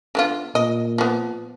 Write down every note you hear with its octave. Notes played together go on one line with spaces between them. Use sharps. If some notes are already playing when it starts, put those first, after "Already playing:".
D3 B3 F4
A#2 D#5
F3 B3